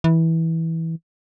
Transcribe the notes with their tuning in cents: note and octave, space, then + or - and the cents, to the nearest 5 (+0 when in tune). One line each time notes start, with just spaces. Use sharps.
E3 -15